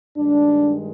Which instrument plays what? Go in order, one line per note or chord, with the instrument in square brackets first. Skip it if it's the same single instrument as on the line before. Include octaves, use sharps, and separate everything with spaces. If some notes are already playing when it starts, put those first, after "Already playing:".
[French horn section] G2 D#3 G#3 D4